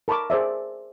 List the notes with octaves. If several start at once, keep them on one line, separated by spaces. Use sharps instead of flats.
A#4 A5 B5 C#6 D6
G#4 C5 D5 E5